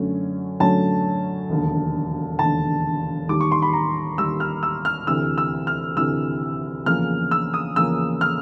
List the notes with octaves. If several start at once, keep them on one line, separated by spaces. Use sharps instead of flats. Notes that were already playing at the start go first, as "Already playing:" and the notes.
Already playing: F#2 D3 F#3 A3 C#4
F#2 D3 F#3 A3 C#4 A5
E1 D#2 D3
E1 D#2 D3 A5
D#2 D#3 G3 D6
C#6
C6
B5
A#5
D#2 D#3 G3 E6
F6
E6
F6
D2 C3 E3 E6
E6
F6
D2 C3 E3 E6
E2 C#3 F3 A#3 F6
E6
D#6
E2 C#3 F3 A#3 E6
F6